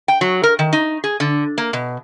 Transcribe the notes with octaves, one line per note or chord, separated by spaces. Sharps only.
G5
F#3
A#4
D#3
D#4
G#4
D3
A#3
B2